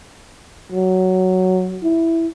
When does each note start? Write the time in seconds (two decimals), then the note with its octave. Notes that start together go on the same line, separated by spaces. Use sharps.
0.72 F#3
1.83 E4